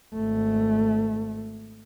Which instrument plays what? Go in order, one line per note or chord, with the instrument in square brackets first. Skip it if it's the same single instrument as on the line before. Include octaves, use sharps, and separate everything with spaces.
[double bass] G#1 A3